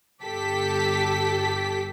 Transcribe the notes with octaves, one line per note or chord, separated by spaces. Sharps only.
G1 G4 A4 B6